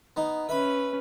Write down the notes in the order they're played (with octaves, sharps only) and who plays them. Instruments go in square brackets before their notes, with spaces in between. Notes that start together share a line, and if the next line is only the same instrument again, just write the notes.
[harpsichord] B3 D#4
[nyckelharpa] C#4 B4 [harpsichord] E5 B5